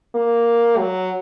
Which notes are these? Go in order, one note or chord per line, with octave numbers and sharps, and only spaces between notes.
A#3
F#3